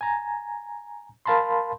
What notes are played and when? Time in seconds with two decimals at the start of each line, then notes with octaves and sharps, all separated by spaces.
0.01 G#5 A#5
1.26 A#4 F5 A5 B5 C6